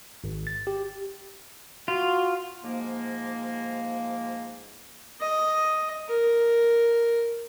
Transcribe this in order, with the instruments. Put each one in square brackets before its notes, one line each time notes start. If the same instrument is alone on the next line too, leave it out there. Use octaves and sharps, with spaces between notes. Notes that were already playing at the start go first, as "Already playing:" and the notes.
[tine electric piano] G#1
A6
G4
[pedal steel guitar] F4 [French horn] F#4
[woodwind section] G#2 F3 A#3
[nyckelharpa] D#5
A#4